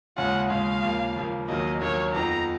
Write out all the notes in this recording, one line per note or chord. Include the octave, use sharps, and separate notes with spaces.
D#2 C#3 G#3 C#4 F4 F#5
D#2 C#3 G#3 C#4 F4 F5
D#2 C#3 F3 A#3
D#2 C#3 F3 A#3
D#2 D#3 F#3 A#3 D#5
D#2 D#3 F#3 A#3 C#5
F2 F3 B3 D#4 A#5